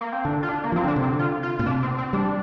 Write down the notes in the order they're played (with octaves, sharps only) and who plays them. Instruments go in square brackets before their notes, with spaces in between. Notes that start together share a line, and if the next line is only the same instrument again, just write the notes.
[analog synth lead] A#3
C4
[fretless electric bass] D3 [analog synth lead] D4
[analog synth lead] F4
D4
A#3
[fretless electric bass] F3 [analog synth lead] C4
[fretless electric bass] D3 [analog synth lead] D4
[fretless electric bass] C3
[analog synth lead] C4
[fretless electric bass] D3
[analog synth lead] F4
F4
[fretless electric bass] A#2 [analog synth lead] F4
[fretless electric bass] C3 [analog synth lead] D4
[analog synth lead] C4
C4
[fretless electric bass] G3 [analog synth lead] D4